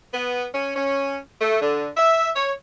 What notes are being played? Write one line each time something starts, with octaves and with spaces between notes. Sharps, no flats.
B3
C#4
C#4
A3
D3
E5
C#5